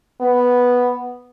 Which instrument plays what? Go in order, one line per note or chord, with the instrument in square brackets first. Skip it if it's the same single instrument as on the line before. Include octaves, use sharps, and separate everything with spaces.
[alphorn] B3